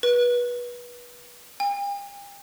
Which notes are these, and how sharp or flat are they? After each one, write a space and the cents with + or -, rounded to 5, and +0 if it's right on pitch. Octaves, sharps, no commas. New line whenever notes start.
B4 -25
G5 +45